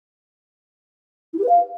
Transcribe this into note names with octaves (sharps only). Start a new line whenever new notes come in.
E4
G4
B4
F5